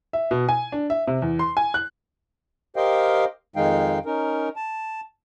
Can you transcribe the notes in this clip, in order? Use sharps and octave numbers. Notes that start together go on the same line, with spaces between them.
E5
B2
G#5
D4
E5
C3
E2
C6
G#5
F#6
G4 A#4 C5 D#5 F5 G5
F2 D#3 G#3 D#4 F5 G5
C#4 D#4 A#4
A5